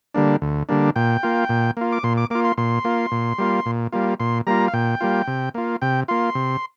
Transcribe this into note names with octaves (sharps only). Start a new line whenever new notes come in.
D3 G3 A#3 D4
D2
D3 G3 A#3 D4
A#2 G5
A#3 F4
A#2
A#3 F4
D6
A#2 C6
D6
A#3 F4 D6
C6
A#2 C6
A#3 F4
A#2
G3 A#3 F4
A#2
G3 A#3 F4
A#2 C6
G3 A#3 F4 A#5
F5
A#2 G5
G3 A#3 F4
C3
A#3 F4
C3 G5
A#3 F4 C6
C3